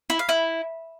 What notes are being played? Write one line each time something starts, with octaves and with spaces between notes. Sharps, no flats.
E4
F5
E4